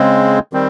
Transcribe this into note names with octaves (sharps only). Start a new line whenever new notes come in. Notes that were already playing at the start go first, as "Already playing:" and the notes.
Already playing: C#3 G#3 C4
D#3 G3 C4